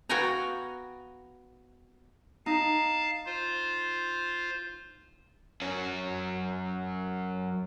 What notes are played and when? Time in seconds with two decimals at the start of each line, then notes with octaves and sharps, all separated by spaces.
0.09 B3 F#4 F5 G5 G#5 A#5
2.46 D#4 F5 A5
3.26 F4 C5
5.62 F#2 C#4